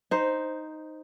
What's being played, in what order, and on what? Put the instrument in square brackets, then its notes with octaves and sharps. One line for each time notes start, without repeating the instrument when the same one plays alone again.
[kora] D#4 C5